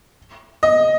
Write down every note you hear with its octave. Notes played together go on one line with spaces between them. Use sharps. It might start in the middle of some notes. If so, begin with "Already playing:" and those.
D#5